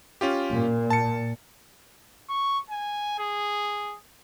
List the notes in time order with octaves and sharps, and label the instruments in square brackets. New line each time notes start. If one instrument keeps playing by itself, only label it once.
[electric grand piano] C#4 F4 G4
[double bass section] A#2
[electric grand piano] A5 C#7
[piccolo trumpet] C#6
G#5
G#4